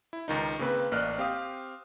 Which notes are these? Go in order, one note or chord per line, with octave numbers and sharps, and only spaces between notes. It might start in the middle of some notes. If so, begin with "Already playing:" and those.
E4
C#2 D#3 D#4
C#3 A#3 C4 B4
A1 A#3 D5 D#5 F6 F#6
C4 G4 F5 D#6